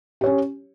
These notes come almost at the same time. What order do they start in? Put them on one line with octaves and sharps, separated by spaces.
G4 C#5 C#4